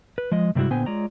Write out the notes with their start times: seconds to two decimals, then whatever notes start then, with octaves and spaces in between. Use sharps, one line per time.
0.18 B4
0.32 F3 G#3 D#5
0.55 G2 C3 G3 G#3 E4 F#4
0.70 A#2 D3 B3 C5 G5 G#5
0.86 G#3 F4 C#5 D5 A#5